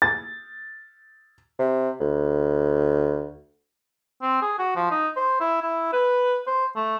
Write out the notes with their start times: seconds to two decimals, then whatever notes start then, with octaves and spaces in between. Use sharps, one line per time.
0.02 A6
1.59 C3
2.01 D2
4.22 C4
4.42 G#4
4.59 F#4
4.76 F3
4.91 D#4
5.16 C5
5.40 E4
5.62 E4
5.93 B4
6.47 C5
6.76 A3